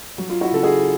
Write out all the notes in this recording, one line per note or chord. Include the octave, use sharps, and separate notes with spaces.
F#3
F4
E4 F#4
C#3 A4
F#4 G#4